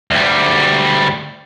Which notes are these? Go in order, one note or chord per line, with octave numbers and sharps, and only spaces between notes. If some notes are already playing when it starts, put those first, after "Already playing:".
D2 G3